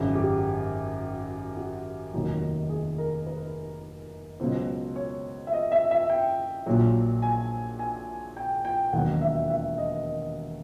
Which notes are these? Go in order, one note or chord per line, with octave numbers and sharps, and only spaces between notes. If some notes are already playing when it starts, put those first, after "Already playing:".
Already playing: G#1 F#2 C#3
G4
F#4
F1 D#2 D#3 F#3
G#4
A#4
B4
C#2 B2 F#3 C5
C#5
E5
D#5
E5
E5
G5
A#1 A#2 F#3
G#5
G#5
G5
G5
E1 D#2 D#3 F#3 F#5
E5
E5
D#5
D#5